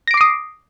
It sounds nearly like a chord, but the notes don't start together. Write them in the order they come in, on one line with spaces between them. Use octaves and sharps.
A#6 D7 D6 C7 D#6